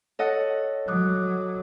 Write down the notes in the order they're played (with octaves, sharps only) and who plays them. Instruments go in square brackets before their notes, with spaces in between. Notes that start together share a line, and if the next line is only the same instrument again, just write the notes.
[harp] A4 D#5 F#5 [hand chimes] C#5
[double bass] F#3 [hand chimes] D6 D#6 F#6